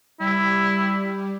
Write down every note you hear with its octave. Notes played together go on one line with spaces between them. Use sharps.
G3 E4